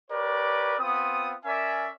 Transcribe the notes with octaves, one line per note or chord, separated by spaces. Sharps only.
G4 A#4 B4 C#5 D5
B3 C4 F4 D#6
C#4 A#4 D5 E5 G#5